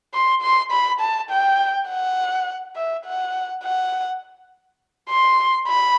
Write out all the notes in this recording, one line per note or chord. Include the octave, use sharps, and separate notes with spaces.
C6
C6
B5
A5
G5
F#5
E5
F#5
F#5
C6
B5